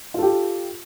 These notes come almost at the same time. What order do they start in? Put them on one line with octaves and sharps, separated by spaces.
F4 A4 G4